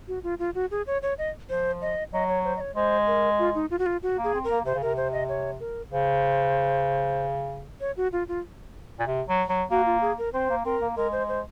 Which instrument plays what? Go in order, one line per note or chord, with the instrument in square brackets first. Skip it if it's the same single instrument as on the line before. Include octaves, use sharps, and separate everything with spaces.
[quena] F#4
F4
F4
F#4
G#4
C#5
C#5
D#5
[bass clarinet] F3 [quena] C5
[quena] D#5
[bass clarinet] F#3 [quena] D#5
[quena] C#5
C5
D#5
C#5
[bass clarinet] G#3 [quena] C5
[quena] A#4
F4
D#4
F4
F#4
F4
F#4
[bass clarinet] A#3
[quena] G#4
[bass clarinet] C4
[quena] A#4
[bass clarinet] A#3
[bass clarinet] C3 [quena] C5
[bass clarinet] C#3
[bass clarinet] C3 [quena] A#4
[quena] C5
D#5
C#5
A#4
[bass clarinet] C#3 [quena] C5
[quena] C#5
F#4
F4
F4
[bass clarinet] A#2
C3
F#3
F#3
[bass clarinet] A#3 [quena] F#4
[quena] F4
G#4
A#4
[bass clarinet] C4 [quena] C5
[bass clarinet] A#3
[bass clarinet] C4 [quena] A#4
[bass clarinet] A#3
[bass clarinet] G#3 [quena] A#4
[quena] C5
C5